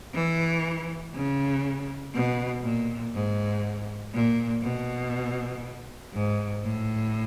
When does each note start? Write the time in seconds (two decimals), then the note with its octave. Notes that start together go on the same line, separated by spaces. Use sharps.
0.14 E3
1.14 C#3
2.14 B2
2.63 A#2
3.14 G#2
4.14 A#2
4.63 B2
6.13 G#2
6.63 A2